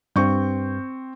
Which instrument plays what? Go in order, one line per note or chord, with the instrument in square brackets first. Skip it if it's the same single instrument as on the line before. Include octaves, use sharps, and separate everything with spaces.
[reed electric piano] G2 [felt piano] C4 C#6 G6